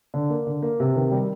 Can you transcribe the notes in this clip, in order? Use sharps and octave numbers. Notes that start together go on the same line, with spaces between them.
D3
A#3
D3
A#3
C3
D#3
G3